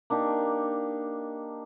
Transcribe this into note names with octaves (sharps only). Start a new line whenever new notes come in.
A#3 D4 D#4 G4